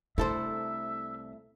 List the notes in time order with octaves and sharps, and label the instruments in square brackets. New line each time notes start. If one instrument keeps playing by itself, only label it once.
[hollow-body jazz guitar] C2 A4 C5 [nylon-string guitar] A3 E4 [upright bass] D4 [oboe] E5